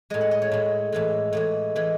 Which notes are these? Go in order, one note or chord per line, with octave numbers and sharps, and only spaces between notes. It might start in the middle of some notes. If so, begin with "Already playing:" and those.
A2 G#3 D#5
F#5
D#5
C#5
A2 G#3
A2 E3 G#3
A2 E3 G#3
E3 G#3